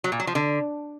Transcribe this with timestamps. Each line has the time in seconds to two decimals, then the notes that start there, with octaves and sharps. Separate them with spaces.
0.04 F#3
0.12 A#2
0.20 F#3
0.27 F3
0.35 D3